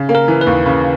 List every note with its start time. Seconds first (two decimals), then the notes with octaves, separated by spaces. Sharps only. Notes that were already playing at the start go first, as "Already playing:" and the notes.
Already playing: C#3
0.09 A#3
0.15 A#4
0.28 E3
0.41 B4
0.47 D#2
0.66 C#3